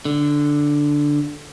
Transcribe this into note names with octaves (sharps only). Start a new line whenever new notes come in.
D3